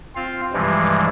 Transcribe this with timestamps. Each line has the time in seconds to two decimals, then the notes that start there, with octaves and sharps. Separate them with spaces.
0.16 C4 F4 F5
0.53 G2 C3 E3 F3 G3 G#3